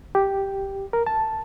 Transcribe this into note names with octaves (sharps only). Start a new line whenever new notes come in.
G4
A#4
A5